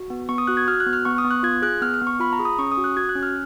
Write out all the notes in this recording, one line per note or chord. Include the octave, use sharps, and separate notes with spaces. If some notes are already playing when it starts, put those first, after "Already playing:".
Already playing: F#4
B3
B3 C#6
D#6
F#4 F#6
G#6
F#4 F6
F#6
B3
F6
B3 C#6
D#6
B3
F#6
F4 G#6
G#4 F#6
B3 F6
F6
B3
C#6
F4 B5
A#5
G#4
D#6
C#4 C#6
D#6
F#4
F#6
F#4 G#6
F#6
C#4
F6